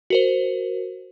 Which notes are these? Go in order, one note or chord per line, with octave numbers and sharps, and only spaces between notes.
F#4 A#4 C5